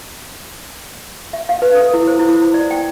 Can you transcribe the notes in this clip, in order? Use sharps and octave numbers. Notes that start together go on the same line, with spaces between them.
E5
F5
B4
A4
E4
C5
E4
C5
D5
G5